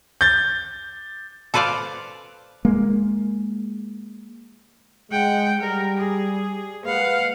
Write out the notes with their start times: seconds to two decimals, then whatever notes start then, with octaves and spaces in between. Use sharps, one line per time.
0.21 G6 A6
1.54 A4 B4 C5 D5 F5
2.65 G#3 A#3
5.11 G#3 F#5 G5
5.61 G3 A#4
5.97 G#4
6.85 G#3 A#3 B4 F5 F#5